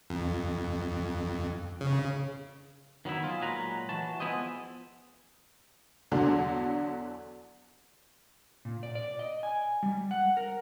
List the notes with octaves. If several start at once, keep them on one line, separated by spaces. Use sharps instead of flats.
F2
C#3
D#3 F#3 B3 E4
F4 G#4
A#2 F#3 G#3 B4 A#5
E3 F#4 A5
F3 B3 E4 G#4 C5 D#5
E2 D3 F#3 D4 C6
A#2
D5
D5
D#5
G#5
G3
F#5
A#4